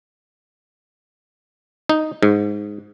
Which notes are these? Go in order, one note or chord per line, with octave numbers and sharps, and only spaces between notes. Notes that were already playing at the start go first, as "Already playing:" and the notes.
D#4
G#2